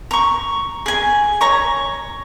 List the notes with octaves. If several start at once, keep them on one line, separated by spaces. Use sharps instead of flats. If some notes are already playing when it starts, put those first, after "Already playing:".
A#5 C#6
G#4 G#5
C#5 A#5 C#6